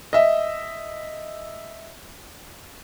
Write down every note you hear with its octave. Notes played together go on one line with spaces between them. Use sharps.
D#5 E5